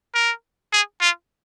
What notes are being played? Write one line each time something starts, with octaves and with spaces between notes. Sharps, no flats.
A#4
G#4
F4